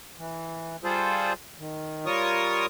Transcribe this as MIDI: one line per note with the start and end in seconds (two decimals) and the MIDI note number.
0.18 0.76 52
0.84 1.33 55
0.84 1.33 65
0.84 1.33 68
0.84 1.33 69
0.84 1.33 72
1.59 2.06 51
2.06 2.66 55
2.06 2.66 65
2.06 2.66 70
2.06 2.66 73
2.06 2.66 85
2.06 2.66 87